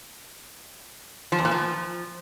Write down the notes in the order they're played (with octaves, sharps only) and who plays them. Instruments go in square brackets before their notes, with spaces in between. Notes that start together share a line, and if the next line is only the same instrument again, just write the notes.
[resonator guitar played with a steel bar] F3
E2
A#2
F3